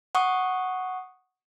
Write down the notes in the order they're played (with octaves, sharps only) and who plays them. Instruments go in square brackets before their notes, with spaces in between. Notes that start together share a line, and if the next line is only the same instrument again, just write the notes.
[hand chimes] F#5 C#6 D#6